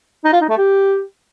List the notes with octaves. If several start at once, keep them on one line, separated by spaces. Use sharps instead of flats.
D#4
F4
D#4
A3
G4